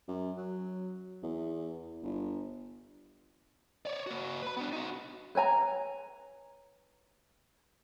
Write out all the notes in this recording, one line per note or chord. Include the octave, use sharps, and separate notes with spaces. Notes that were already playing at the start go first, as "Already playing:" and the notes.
F#2
F#3
E2
G1
C#5 D5
A#3 F#4
B4 B5
B3 D4
D#4 F#4
B4 C#5 G#5 A#5